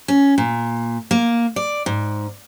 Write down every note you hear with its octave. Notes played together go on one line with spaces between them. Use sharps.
C#4
A#2
A#3
D5
G#2